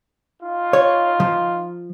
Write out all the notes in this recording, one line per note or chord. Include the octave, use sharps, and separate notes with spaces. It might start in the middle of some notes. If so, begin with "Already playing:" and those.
D#4 F4
C#5
F3